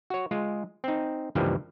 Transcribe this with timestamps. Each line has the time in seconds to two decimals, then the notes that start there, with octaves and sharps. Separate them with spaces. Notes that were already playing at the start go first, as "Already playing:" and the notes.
0.10 F#4 C#5
0.31 G#3 F4
0.84 C4 D#4
1.35 C#2 G2 E3 F3 G3 A#3